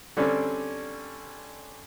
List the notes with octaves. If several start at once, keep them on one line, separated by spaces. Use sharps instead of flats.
D3 G3 C4 C#4